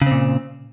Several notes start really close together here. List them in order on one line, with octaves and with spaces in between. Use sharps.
C#3 C4 A#2